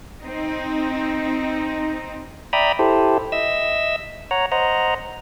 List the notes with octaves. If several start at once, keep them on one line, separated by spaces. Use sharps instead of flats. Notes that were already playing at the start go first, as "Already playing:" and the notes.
C4 D#4
D5 E5 G5 A#5 B5 D#6
E4 G4 A4 C5
D#5 E5 E6
C#5 F#5 A#5
C5 D#5 F#5 A#5